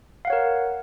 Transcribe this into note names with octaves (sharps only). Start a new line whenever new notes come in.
A#4 C#5 F5 F#5